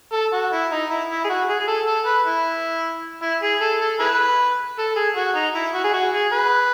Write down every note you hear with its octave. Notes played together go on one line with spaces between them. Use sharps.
A4
F#4
E4
D#4
E4
E4
G#4
F#4
G#4
G#4
A4
A4
B4
E4
E4
G#4
A4
A4
E4 G#4 B4
A4
G#4
F#4
D#4
E4
F#4
G#4
F#4
G#4
B4